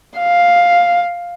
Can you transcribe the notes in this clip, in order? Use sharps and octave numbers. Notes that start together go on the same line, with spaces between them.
F5